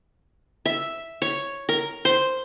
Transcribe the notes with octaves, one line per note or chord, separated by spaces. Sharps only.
E5
C#5
A#4
C5